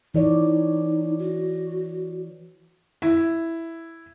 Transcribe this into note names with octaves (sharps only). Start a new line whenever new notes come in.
E3 D#4 C#5 D5
F#4
E4